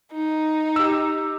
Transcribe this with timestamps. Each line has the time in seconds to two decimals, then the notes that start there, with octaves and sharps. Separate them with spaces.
0.12 D#4
0.76 G4 E6